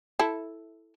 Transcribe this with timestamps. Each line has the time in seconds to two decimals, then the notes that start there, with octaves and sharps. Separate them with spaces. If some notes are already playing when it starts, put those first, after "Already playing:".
0.19 E4 A4